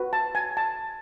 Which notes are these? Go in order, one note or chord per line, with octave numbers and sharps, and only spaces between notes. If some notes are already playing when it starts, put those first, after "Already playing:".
Already playing: F#4 B4
A5
G#5
A5